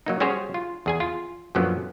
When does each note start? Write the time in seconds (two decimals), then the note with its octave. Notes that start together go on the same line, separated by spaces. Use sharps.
0.06 F#3 A#3 D#4
0.20 G3 C#4 F#4 G#4 C5 C#5
0.54 F4
0.86 E2 G#4 G#5
1.00 F4
1.55 F#2 A#2 D3 F3 F#3 B3